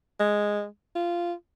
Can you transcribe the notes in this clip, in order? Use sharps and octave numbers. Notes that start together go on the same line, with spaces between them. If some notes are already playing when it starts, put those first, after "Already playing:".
G#3
F4